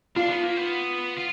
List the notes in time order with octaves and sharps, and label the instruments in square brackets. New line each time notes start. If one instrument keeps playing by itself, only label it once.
[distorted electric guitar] D4 [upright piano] F4
[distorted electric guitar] B3
A#3
B3
F4